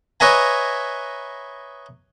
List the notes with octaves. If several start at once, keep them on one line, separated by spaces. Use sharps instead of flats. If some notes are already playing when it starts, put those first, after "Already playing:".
B4 C#5 D#5 E5 G#5 A#5